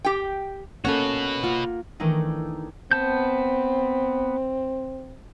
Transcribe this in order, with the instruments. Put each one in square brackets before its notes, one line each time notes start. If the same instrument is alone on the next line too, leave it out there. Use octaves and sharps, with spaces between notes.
[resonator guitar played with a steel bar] G4 G5
[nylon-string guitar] A#3 C#4 A4 [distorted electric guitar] F#4 B4 [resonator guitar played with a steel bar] C#5
[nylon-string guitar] A#3 F4 F#5
[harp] D#3 E3 A3 D4 D#4
[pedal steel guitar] B3 A5 G6 [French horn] C4